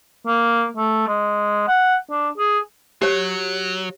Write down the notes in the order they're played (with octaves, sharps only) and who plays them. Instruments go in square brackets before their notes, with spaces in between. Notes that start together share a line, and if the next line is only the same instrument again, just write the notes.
[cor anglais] A#3
A3
G#3
F#5
D4
G#4
[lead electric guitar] F#3 [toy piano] G4 C#5